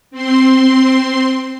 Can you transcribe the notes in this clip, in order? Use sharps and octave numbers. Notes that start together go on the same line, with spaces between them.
C4 C6